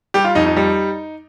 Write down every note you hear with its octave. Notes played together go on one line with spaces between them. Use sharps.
G3 G4
F4
F2 D#4
D#4
G3